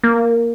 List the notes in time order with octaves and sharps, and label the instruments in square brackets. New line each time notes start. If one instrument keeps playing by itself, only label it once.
[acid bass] A#3